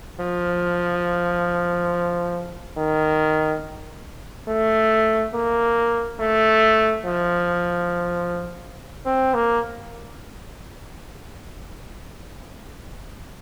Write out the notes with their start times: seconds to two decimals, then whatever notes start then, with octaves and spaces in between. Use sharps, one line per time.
0.20 F3
2.77 D#3
4.48 A3
5.34 A#3
6.20 A3
7.05 F3
9.05 C4
9.34 A#3